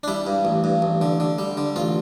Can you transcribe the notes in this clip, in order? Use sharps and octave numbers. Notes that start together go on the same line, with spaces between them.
D4
G3 E4
G2
A1
G2
A1
D3
D3
G3
D3
A1 F4